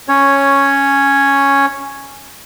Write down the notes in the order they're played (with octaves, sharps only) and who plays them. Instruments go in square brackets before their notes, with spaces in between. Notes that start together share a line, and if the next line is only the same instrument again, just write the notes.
[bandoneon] C#4 C#5